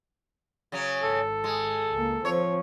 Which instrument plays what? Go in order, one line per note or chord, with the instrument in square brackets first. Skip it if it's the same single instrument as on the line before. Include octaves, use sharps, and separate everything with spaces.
[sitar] C#3 F#3 C#4
[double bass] G#1 [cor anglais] A4
[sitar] G#3
[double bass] C#2 A#3
[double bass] F3 C4 [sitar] C#5